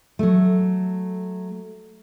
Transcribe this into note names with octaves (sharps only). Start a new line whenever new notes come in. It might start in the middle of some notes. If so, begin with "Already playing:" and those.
F#3 A3